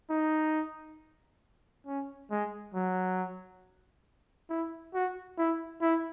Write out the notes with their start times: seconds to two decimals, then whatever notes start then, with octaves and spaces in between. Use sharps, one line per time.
0.11 D#4
1.87 C#4
2.31 G#3
2.74 F#3
4.50 E4
4.94 F#4
5.38 E4
5.81 E4